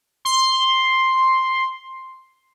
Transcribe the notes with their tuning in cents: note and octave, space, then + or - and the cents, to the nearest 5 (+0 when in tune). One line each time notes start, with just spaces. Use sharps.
C6 +5